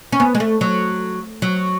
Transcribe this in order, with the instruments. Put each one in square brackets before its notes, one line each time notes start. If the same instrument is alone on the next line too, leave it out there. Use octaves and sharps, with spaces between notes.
[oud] C#4
B3
G#3
A3
F#3
F#3